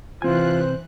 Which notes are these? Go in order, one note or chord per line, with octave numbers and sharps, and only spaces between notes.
C3 E3 C4 F4 C5 G#5 F#6